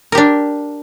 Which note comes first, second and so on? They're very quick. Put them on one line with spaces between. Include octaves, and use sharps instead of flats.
A#4 G4 D4